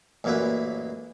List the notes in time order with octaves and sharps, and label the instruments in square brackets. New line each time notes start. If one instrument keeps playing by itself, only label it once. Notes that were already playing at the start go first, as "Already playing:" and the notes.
[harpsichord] A1 F#2 A#2 A#3 E4 B4